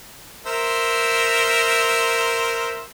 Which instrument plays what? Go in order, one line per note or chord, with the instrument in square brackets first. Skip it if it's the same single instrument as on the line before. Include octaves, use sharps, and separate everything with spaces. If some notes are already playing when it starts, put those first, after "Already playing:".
[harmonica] A#4 C5 E5